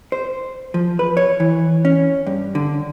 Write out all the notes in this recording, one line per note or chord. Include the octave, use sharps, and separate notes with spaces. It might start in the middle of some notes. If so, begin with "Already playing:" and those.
C5
F3
B4
C#5
E3
C#4
G2
D3